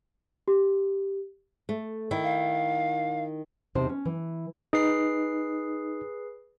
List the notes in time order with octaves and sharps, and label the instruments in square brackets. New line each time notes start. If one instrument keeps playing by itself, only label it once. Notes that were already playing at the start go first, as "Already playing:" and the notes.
[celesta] G4
[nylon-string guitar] A3
D#3 E4
[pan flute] F5
[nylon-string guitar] E2 C3 D#4 C5 A5
C#4
E3
[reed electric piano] D#4 [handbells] G#4 B4 C7